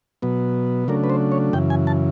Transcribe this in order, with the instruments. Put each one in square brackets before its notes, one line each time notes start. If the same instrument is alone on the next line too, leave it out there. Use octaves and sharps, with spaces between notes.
[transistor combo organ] B2 F#3 B3
C#3 F#3 A3 D4 A#4
B4
C5
C#5
F#2 C#3 E3 G5
G#5
A5